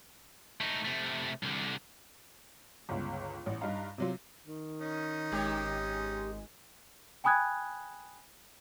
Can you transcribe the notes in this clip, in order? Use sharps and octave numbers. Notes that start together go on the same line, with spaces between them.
A3 D#4
C3 A3
C2 D3
G1 C#2
A1
G2 D#4 F5 A#5
C3 F#3 F4
D#3
C#4 D#4
G#1 G#3 G4 C#5
G5 G#5 B5 D#6 F#6 G#6